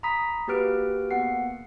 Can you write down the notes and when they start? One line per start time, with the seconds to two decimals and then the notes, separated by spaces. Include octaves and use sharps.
0.03 A#5 B5 D#6 B6
0.47 A#3 F#4 G4 B4 F6 D7
1.11 A#3 B3 G#4 F#5 C7